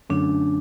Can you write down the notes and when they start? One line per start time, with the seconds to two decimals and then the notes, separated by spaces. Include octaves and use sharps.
0.10 F#2 D3 F#3 A3 C#4 D4